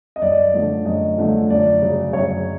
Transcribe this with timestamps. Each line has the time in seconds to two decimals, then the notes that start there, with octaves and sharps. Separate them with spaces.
0.16 D#5
0.22 F#2 D5
0.54 D3 F3 A3
0.85 F#2 D#5
1.18 D3 F3 A3
1.50 F#2 D5
1.81 C#3 F#3
2.13 F#2 C#5